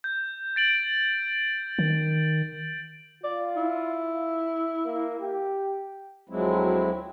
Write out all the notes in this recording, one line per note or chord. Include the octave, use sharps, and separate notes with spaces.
G6
A6 D7 F#7
D#3
F4 D5
E4
A#3
G4
D2 F3 F#3 G#3 C4 E4